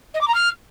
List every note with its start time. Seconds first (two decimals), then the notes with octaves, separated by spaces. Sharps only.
0.14 D#5
0.21 D6
0.28 A#5
0.34 F6